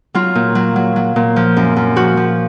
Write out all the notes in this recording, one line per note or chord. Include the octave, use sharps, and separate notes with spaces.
F#3 F4
A#2
F#3
F#3
F#3
A#2
F3
F#2
F#2
F3 F#4
F3